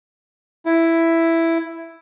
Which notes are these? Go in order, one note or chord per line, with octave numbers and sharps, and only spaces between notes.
E4